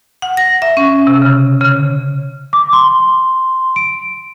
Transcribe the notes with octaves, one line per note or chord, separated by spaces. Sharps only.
F#5
A#6
E5
C#4
C3
C#3
C#3
D6
C6
D7